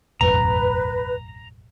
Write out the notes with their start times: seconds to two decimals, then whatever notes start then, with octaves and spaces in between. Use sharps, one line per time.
0.21 E1 A1 F#2 B4 A#5